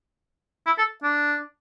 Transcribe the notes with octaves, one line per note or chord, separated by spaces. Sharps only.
E4
A4
D4